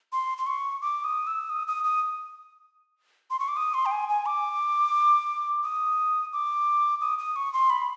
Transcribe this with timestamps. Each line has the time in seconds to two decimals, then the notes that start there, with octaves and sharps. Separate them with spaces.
0.13 C6
0.38 C6
0.47 C#6
0.82 D6
1.04 D#6
1.27 E6
1.50 D#6
1.67 D#6
1.84 D#6
3.30 C6
3.40 C#6
3.48 D6
3.57 D#6
3.74 C6
3.86 G5
3.91 G#5
4.09 G#5
4.26 D6
5.63 D#6
6.33 D6
7.01 D#6
7.18 D#6
7.36 C#6
7.53 C6
7.70 B5